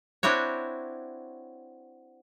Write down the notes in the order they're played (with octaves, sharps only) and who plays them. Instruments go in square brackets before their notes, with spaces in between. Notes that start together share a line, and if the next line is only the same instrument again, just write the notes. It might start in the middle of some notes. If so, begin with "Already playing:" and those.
[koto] C4 D4 E4 F#4 C#5